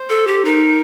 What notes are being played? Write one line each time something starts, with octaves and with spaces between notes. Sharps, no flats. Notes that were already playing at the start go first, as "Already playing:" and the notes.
Already playing: C5
A4
G4
D#4 A#4